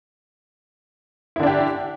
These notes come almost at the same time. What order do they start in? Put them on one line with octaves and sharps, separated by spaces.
E4 D3 D4 G4